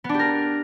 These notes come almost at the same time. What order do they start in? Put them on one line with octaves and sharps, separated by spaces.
B3 D4 G4 A#4